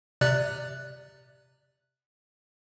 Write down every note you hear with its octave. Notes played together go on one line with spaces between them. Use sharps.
C3 D5 F#6